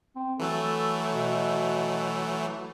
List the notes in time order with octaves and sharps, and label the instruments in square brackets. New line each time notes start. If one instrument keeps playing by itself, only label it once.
[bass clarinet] C4
[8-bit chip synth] E3 F#3 A3 [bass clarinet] A4
[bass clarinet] B2